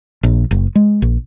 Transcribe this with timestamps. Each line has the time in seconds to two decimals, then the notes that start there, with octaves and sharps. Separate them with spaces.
0.23 A#1
0.51 F#1
0.75 G#3
1.02 A#1